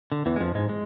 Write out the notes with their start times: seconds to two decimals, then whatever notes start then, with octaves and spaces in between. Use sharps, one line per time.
0.12 D3
0.26 E2 E3
0.36 G#3
0.40 F2 F3
0.55 G#2 G#3
0.69 G#3